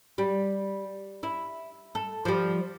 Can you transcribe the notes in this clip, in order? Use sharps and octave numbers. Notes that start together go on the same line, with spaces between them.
G3
E4
A4
F3 G3